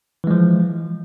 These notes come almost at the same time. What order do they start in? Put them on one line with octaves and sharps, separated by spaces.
E3 G#3 F3